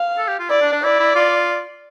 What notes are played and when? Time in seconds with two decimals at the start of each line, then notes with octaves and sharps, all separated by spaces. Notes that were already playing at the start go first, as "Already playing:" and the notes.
Already playing: F5
0.18 A4
0.28 G4
0.39 F4
0.50 E4 D5
0.61 D4
0.73 D4
0.83 E4 D5
1.00 E4
1.15 F4